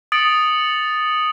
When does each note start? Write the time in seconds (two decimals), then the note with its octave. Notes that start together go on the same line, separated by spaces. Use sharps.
0.12 D#6 A6 C#7 D7 F#7